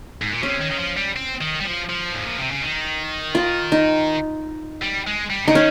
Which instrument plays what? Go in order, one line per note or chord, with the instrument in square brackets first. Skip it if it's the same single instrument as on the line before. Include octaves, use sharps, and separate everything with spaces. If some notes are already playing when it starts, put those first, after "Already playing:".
[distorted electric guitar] G#2
A#2
[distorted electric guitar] C3 [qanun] C#4
[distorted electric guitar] D#3
D#3
F3
G3
C4
D#3
G3
F3
F3
G#2
A#2
C3
C#3
D#3
[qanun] F4
D#4
[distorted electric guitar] G3
G#3
G3
[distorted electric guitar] C#3 [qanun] D#4
[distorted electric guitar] D#3 [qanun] C#4